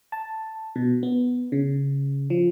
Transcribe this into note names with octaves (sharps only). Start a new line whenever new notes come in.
A5
B2
B3
C#3
F3